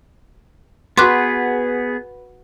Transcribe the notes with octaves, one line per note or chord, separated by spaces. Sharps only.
B3 F#4 G#4 B4 C6 D6 F#6